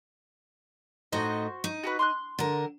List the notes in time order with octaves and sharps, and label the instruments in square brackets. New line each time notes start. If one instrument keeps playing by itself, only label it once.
[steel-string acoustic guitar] A2 D#4 D#5 [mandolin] F#4 C5
[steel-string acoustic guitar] D#4
[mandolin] F#4 G4 B4
C6 D6 F#6
[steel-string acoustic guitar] D3 A#4